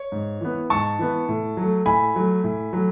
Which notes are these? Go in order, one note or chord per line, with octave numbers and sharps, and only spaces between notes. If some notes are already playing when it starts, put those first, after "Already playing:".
Already playing: C#5
G#2
E3 B3
G#2 A5 C#6
E3 B3
A2
F#3 A3
A2 G#5 B5
F#3 A3
A2
F#3 A3